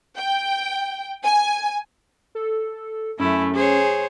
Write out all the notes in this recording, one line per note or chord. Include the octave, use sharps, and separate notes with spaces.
G5
G#5
A4
F#2 A3 C#4 E4
G#4 C5 C#5